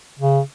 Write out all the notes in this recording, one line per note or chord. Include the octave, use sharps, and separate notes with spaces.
C#3